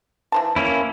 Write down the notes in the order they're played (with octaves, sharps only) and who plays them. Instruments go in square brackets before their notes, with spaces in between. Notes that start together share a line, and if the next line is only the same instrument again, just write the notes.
[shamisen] E3 C5 A5
[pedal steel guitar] A#3 C#4 E4